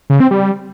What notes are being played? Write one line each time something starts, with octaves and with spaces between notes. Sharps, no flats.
C#3
C4
G3